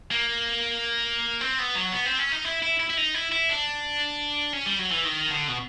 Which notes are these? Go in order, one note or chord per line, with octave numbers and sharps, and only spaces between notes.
A#3
C4
B3
F#3
B3
C4
C#4
D#4
E4
E4
E4
E4
D#4
E4
E4
D4
C#4
G3
F#3
E3
D#3
D3
B2